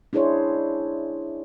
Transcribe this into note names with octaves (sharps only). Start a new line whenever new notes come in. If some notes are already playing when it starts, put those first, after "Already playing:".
D4 E4 G#4 C5 C#5